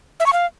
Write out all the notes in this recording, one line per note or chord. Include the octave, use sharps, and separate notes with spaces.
E5
C#6
F5